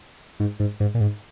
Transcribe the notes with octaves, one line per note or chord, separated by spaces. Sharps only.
G#2
G#2
G#2
A#2
G#2